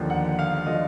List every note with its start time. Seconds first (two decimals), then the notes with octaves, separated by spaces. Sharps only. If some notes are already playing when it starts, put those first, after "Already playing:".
Already playing: D#2 D3 F3
0.10 F#5
0.39 F5
0.66 D3 F3 D#5